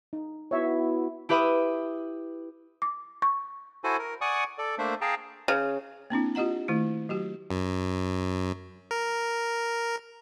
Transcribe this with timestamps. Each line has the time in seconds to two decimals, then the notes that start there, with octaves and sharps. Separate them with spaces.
0.13 D#4
0.51 B3 E4 F#4 C#5 E5
1.29 E4 G4 B4 E5 B5 D#6
2.82 D6
3.22 C#6
3.84 E4 F#4 A4 C5 G#5
3.99 A#4
4.21 D5 F#5 G#5 C#6 D#6
4.58 A4 D5
4.78 A3 A#3 D4 C5 E5
5.01 G#4 F5 G5 A5 A#5
5.48 C#3
6.10 A#3 C4 D4 E4
6.35 F4 G4 D#5 F#5 A#5
6.68 D#3 A3 E4
7.09 F#3 F#4 G4
7.50 F#2
8.91 A#4